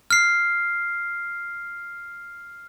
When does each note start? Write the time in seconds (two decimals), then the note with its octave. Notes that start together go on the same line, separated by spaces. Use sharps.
0.10 F6 C7